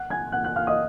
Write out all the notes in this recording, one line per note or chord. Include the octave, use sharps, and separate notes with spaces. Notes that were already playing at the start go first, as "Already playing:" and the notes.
Already playing: F#5 F#6
G#5 G#6
F#5 F#6
F#5 F#6
F5 F6
D#5 D#6